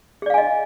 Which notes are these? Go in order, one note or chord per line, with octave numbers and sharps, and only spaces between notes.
G#4 D5 D#5 F5 G#5